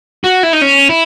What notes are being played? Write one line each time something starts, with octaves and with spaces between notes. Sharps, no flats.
F#4
E4
D#4
C#4
E4